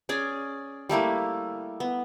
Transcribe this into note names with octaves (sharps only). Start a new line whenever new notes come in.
C#4 G#4 D5 G#5
G3 A3 A#3 E4
B3